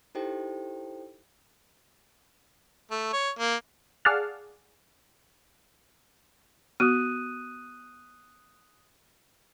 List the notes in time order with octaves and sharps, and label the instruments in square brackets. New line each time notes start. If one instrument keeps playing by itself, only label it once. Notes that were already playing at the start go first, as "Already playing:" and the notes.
[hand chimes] D#4 E4 G4 A4 C5 G5
[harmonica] A3
C#5
A#3
[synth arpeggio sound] G#4 D5 F5 F#5 A5 F6
[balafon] B3 F#4 [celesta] D#6 F#6 D#7